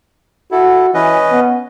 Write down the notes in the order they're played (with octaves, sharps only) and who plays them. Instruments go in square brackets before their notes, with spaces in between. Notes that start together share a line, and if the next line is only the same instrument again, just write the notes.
[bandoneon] E4 A4 [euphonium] F#4
[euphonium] E3 [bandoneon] C#4 B4 D#5
[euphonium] B3